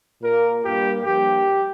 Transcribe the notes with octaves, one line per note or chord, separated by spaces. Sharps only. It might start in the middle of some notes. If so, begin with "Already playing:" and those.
A#2 A#3 A#4
G2 G3 A#3 G4
G2 F3 A#3 G4